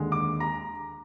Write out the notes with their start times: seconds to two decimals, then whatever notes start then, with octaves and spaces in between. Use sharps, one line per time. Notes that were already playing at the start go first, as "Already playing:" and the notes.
Already playing: D#2 D3 G#3
0.12 D6
0.40 A#5